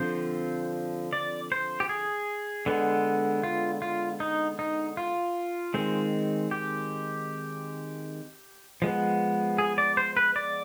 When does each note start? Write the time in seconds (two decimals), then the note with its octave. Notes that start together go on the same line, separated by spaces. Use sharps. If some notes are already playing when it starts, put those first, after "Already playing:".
Already playing: D3 F3 C4 C5
1.13 D5
1.52 C5
1.80 G4
1.89 G#4
2.66 D3 G#3 B3
3.43 F4
3.82 F4
4.20 D#4
4.59 D#4
4.97 F4
5.74 D#3 G#3 C4
6.51 G4
8.82 F3 G#3 B3
9.58 G#4
9.78 D5
9.97 C5
10.17 B4
10.36 D5